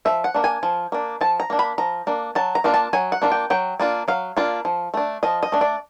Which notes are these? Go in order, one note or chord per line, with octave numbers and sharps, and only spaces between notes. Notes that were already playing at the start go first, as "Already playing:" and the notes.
F3 E5
F#5
A#3 D4
G#5
F3
A#3 D4
F3 A5
A#5
A#3 D4
B5
F3 A#5
A#3 D4
F#3 A5
A#5
A#3 D4 F4
A5
F#3 G#5
F#5
A#3 D4 F4
G5
F#3 G5
A#3 D4 F4
F#3 F5
A#3 D4 F4
F3
A3 D4
F3 D#5
D#5
A3 D4
D5